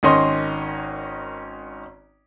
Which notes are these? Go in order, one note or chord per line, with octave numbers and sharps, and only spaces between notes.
G#1 D#3 C#4 D#5 C6